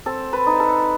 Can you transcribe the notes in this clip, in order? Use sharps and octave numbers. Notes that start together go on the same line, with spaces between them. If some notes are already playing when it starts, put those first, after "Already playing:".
C4 A4
B4
D#4
A4